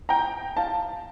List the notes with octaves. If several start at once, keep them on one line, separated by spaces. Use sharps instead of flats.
G5 A#5
F5 A5